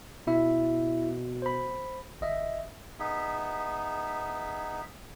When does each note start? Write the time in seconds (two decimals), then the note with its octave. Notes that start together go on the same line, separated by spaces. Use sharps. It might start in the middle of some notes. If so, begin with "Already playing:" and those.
0.27 B2 E4 E5
1.42 C5 B5
2.21 G1 D#5 E5
2.99 B3 D#4 G#4 E5